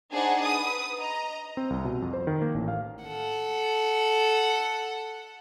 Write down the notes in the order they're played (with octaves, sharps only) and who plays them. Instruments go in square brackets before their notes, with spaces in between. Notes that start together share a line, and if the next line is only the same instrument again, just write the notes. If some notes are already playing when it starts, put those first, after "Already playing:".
[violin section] D4 D#4 G#4 C5 F#5
B4 D#6
D#5 A#5
[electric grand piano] C4
C2
B2
F2
C5
D#3
A#3
A1
F5
[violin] A4 F#5